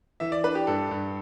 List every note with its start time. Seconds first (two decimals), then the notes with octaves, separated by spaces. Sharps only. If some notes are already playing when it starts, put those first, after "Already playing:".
0.20 E3 E5
0.32 D5
0.44 D4 B4
0.55 G4
0.67 G2 A4
0.91 G2